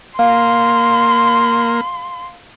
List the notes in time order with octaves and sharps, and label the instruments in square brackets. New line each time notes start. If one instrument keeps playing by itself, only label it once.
[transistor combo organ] A#3 [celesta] F5 [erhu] C6